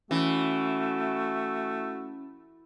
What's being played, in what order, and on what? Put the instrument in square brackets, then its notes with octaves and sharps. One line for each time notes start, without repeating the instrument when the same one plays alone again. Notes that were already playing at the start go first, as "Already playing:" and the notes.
[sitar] E3 [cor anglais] A3 [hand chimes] C#4 [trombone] F#4